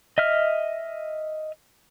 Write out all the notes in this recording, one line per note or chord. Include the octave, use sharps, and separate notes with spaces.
D#5 E5 F6